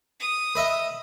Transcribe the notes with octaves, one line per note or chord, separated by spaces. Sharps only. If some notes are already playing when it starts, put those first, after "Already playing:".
D#6
B4 D#5 E5